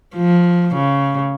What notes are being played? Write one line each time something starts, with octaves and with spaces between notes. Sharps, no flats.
F3
C#3